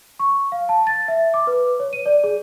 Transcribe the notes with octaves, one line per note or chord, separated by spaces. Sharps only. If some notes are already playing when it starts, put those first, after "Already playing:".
C#6
F5
A5
A6
E5
D6
B4
C#5
D#7
D5
G#4